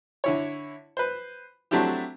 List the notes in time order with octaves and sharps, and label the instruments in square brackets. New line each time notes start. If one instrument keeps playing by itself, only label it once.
[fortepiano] D3 E4 C#5
B4 C5
F#3 A3 C4 D4 E4 G4